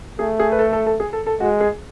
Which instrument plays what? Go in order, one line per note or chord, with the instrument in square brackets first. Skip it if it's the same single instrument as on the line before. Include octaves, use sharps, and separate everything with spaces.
[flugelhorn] A3 [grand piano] G#4
[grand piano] G#4
B4
A4
A4
A4
G#4
A4
A4
[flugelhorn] G#3 [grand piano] F#4
[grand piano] G#4